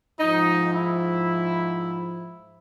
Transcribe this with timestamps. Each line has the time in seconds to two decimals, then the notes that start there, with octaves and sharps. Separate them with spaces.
0.19 G#2 F3 D#4
0.72 E4